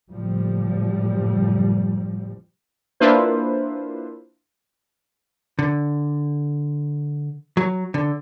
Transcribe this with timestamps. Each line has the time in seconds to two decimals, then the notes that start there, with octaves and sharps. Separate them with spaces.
0.11 F#1 A2 F3 G3
3.00 A#3 D4 E4 F4 B4 C5
5.59 D3
7.57 F#3
7.94 D3